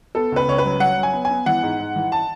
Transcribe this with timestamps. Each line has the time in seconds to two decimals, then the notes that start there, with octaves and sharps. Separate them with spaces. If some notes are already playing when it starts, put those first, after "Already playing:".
0.15 B3 A4
0.32 C#2 B4
0.48 C#2 C#5
0.58 B4
0.65 F#3
0.80 F#3 F#5
0.97 F#3
1.03 G#5
1.13 B3
1.25 G#5
1.30 B3
1.46 E3 F#5
1.63 G#2
1.79 G#2
1.96 E3
2.12 A5